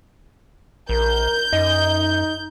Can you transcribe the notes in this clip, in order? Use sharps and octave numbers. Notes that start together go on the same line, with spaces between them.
A#1 A#4 G6
F#2 D#4 D#5